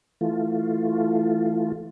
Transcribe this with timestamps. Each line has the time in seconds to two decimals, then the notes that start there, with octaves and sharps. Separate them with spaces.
0.21 E3 A3 F4